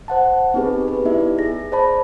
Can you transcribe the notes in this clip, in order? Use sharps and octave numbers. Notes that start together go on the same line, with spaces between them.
C5 F#5 A5
B3 C4 D#4 G4 G#4 B4
G4 B4
B3 D#4 E4 D5 E5
G#4 A#6
C5 D5 A5 B5